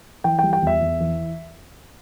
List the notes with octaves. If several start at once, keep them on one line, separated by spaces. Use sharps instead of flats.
E3 G5
G3 G5
G5
E2 E5
E2
E3